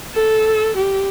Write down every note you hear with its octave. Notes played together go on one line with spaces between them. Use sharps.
A4
G4